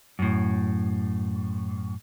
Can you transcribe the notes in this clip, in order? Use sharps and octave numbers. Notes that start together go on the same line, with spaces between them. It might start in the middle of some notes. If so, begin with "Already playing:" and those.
F#2 A2